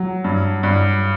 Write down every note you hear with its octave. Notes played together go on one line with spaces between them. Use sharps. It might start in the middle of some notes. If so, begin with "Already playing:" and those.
Already playing: F#3
G2
G2